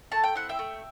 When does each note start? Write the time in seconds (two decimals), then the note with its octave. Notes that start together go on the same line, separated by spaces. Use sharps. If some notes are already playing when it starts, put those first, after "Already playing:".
0.12 A3 A5
0.23 G5
0.35 C4 E4 F#5
0.49 E5 G5
0.59 A3